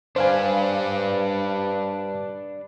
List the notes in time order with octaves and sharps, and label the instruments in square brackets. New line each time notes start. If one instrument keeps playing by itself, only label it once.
[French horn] G2 [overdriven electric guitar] D4 B4 [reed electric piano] C5 F5 G#5